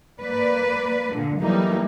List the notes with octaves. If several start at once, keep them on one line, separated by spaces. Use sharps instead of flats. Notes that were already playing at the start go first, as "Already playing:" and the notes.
A#3 B4 D5
A#2 D3
E3 F#3 G3 A3 A#3 D#4